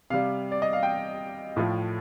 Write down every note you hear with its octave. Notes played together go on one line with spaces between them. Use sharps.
C3 G3 F5
D5
D#5
F5
G5
A2 F3 A3